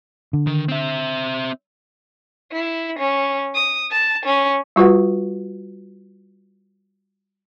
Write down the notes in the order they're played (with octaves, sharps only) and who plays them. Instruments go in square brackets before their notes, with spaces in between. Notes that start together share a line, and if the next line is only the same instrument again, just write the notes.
[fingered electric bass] D3
[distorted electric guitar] D#3
C4 E5
[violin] E4
C#4
D#6
A5
C#4
[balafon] G3 F4 F#4 B4 F#5